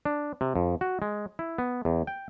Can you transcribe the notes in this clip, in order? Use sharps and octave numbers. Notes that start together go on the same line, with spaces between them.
D4
C3
F2
F#4
G#3
E4
B3
E2
G5